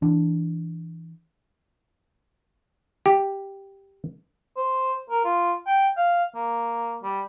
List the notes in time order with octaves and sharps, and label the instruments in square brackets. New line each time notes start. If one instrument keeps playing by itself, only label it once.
[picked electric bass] E3 D4
[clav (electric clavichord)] G4
[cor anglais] C5
A#4
F4
G5
F5
A#3
G3